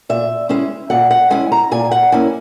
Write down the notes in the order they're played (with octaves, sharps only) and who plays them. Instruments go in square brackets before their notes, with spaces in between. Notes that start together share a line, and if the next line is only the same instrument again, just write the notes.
[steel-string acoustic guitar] A#2 E5
G#3 C#4 E4 E5
A#2 F#5
F#5
G#3 C#4 E4 G#5
A#5
A#2 G#5
F#5
A#3 C#4 E4 G#5